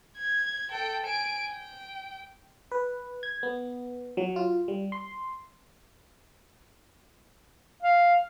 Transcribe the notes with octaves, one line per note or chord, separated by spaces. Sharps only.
G#6
A4 G5
G#5 D7
G5
B4
G#6
B3
F#3
F4
G3
C6
F5